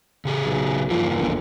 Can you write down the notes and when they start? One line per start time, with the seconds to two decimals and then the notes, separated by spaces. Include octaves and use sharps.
0.25 C#3 G4 G#4
0.45 B1
0.90 E2 G2 F3 A#3
1.19 G1